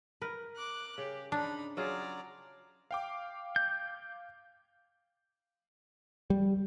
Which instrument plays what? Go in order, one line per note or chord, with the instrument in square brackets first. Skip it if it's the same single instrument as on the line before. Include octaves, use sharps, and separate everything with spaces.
[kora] A#4 [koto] B4
[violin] D6 F#6
[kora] C#3 [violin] G4
[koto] D4 [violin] D#4 B5
[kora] F#3 F4 G#4 [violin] D5 A#5
[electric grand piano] F5 G5 D6
[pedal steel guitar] G6
[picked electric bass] G3